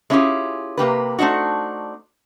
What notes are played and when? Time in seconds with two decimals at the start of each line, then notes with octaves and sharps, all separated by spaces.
0.10 G#3 C#4 E4 F4 G4 G#4
0.77 C3 A#3 G4 B4
1.19 A3 C4 D4 D#4 F#4